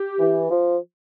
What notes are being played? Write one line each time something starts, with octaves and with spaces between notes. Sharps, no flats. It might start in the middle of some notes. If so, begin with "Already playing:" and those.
Already playing: G4
E3
F3